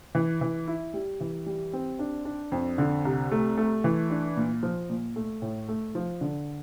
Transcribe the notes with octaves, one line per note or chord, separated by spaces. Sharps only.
E3
E3
E4
G3
E3
G3
C4
D4
D4
F2
D3
C2
A3
A3
E3
D4
A#2
F3
A#2
A3
A2
A3
F3
D3